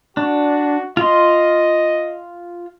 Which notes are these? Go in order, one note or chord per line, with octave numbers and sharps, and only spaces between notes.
D4 F#4
F4 D#5 C6